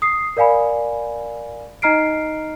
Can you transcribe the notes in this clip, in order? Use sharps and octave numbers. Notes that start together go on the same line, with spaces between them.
D#6 C7
A#4 D5 F5 G#5 B5
D#4 D#5 A#5 F6 C7 D7